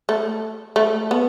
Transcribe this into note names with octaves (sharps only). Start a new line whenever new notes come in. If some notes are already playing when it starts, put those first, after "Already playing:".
A3
A3
B3